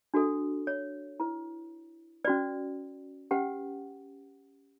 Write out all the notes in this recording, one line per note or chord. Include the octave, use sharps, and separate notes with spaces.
D4 F#4 A4
C#5
E4 B4
C#4 F#4 B4 D5
C#4 G4 B4 F#5